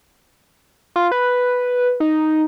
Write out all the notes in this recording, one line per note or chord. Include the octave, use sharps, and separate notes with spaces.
F4
B4
D#4